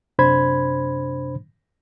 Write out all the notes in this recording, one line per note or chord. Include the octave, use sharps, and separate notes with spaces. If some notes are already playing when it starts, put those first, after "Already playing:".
F#2 C3 D4 C5 B5 G#6